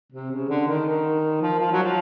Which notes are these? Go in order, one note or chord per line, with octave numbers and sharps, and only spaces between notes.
C3
C#3
D3
D#3
D#3
F3
F3
F#3
F3